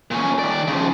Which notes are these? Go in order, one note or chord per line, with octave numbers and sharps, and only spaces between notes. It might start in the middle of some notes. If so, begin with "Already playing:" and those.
A#2 C#4
D#3 D5
C#3 F3